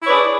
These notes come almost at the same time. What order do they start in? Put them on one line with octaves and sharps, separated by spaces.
E4 C#5 B4 D5 G#4